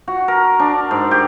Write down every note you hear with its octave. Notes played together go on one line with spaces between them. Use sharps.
F#4
A#4
D4
G#2
G4